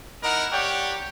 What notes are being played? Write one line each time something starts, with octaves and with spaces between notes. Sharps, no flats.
D#4 E4 A#4 D#5 F#5 A#5
G4 C#5 D5 F#5 G5